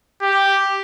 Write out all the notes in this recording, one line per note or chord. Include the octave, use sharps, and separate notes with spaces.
G4